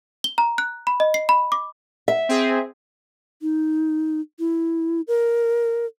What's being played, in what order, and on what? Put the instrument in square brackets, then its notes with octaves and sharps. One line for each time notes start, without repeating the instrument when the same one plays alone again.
[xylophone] G7
A#5
F#6
B5
D#5
C7
B5
D6
[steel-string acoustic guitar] E5
[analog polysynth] C4 G#4
[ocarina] D#4
E4
A#4